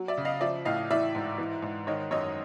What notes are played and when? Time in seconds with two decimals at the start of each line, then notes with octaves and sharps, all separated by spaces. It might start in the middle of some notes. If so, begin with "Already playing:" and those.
Already playing: F#3
0.08 D5 E5
0.18 C#3
0.25 D#5 F5
0.41 F3 D5 E5
0.65 A2 D#5 F5
0.91 E3 D5 E5
1.15 G#2
1.38 E3
1.62 G#2
1.87 D#3 C#5 D#5
2.11 F#2 C#5 D#5